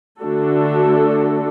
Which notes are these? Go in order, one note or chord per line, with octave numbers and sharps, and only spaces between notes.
D3 A3 D4 F#4 A4